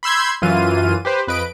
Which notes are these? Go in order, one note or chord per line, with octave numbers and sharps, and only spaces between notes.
B5 C6 E6 G6 G#6
F#2 E3 F4 D#7
G4 B4 C5
F2 B4 D#5 D7